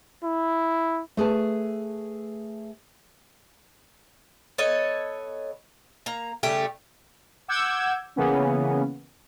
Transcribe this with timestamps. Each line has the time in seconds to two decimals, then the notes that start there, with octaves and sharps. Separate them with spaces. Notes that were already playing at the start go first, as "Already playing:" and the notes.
0.25 E4
1.17 A3 G#4 B4 A5
4.58 B3 A4 C#5 D#5
6.06 A#3 A#5
6.43 C#3 G3 A3 G4
7.48 F#5 D6 E6 G6 G#6
8.16 C#3 E3 A#3 B3 C#4